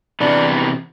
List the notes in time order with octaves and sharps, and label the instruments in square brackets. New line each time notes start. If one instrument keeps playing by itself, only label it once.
[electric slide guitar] C3 E3 B3 [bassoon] D4